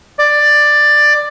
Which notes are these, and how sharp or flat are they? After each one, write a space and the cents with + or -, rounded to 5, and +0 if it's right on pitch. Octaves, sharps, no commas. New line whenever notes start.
D5 +10